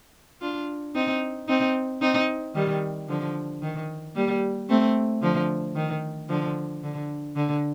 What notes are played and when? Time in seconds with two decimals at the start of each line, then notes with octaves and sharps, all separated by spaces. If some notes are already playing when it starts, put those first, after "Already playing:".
0.41 D4 F4
0.95 C4 D#4
1.48 C4 D#4
2.01 C4 D#4
2.55 D#3 G3
3.09 D3 F3
3.62 D#3
4.15 G3 A#3
4.69 A3 C4
5.22 D3 F3
5.76 D#3
6.29 D3 F3
6.83 D3
7.36 D3